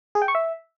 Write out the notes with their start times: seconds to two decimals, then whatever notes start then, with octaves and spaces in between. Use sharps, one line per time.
0.15 G#4
0.22 G5
0.28 C#6
0.35 E5